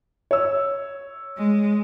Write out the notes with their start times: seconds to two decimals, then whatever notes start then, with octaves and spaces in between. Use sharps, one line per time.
0.31 C#5 E6
1.37 G#3